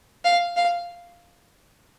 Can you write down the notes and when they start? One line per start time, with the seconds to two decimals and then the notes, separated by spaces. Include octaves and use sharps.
0.24 F5
0.57 F5